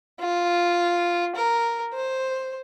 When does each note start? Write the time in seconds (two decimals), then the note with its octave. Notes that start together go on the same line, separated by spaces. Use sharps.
0.20 F4
1.36 A#4
1.93 C5